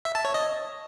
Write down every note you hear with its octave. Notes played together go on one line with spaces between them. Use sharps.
E5
A5
C#5
D#5